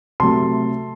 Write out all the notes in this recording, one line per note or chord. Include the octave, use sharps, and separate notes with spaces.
C3 F#3 A3 A5 C6